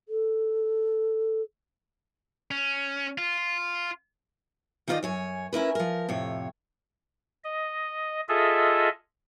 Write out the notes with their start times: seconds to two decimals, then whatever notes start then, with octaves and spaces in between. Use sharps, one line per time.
0.08 A4
2.51 C#4
3.18 F4
4.88 D#3 D#4 F4 A#4 D5 D#5
5.03 F#2 C#5 G#5
5.53 C#4 E4 A#4 B4
5.75 F3 A#4
6.09 F2 A2 C3 C#5
7.44 D#5
8.29 F4 G#4 A4 D#5 E5